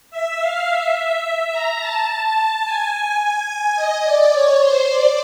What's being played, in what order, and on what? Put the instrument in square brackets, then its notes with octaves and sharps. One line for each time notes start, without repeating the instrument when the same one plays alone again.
[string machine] E5
F5
E5
A#5
A5
G#5
G#5
G#5
D#5
D5
C#5
C5
D5